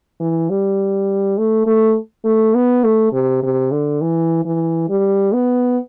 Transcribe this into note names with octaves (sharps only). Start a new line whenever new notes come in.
E3
G3
A3
A3
A3
B3
A3
C3
C3
D3
E3
E3
G3
B3